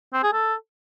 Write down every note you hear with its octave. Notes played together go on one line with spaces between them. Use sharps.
C4
G#4
A4